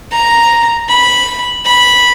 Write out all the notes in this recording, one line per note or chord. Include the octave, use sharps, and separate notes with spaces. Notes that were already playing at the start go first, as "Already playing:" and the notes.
A#5
B5
B5